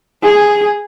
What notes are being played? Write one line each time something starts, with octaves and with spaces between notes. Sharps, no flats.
G#4